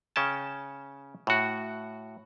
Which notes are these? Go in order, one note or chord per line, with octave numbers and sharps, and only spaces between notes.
C#3 C#4 G5 A5
A2 F#4